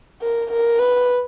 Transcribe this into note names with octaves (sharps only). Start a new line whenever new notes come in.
A#4
A#4
B4